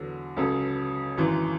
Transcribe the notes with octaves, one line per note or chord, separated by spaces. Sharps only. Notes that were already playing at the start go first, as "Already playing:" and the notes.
Already playing: E2 D3 F#3
C#2 C#3 F#3 A4
G#1 F#2 E3